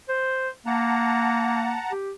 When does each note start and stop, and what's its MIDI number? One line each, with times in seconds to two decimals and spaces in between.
0.09 0.49 72
0.66 1.75 58
0.66 1.92 78
0.66 1.92 81
0.66 1.92 82
1.91 2.11 67